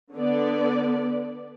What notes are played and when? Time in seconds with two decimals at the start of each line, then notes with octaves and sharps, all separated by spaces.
0.14 D3 B3 D5